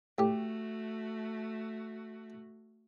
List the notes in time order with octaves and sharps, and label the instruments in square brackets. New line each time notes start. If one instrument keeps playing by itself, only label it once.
[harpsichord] A2 G4 [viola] A3 F#4